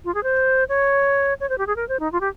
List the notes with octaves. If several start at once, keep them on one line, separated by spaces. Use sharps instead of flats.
F4
G#4
C5
C#5
C#5
C5
G4
G#4
A#4
C5
D#4
F4
G4